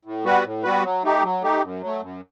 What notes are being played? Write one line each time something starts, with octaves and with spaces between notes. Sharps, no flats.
A2
G3 B3 F#4 B4
A2
G3 B3 F#4 B4
F#3
A3 D#4 G4
F#3
A3 D#4 G4
F#2
F#3 A3
F#2